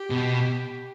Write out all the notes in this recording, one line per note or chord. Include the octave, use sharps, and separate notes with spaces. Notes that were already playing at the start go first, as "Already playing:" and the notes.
Already playing: G4
B2